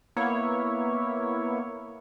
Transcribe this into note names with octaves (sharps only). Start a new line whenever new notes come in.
A#3 B3 E4 C#5